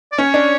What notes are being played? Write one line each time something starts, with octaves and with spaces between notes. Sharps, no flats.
D5
C#4 C#5
D4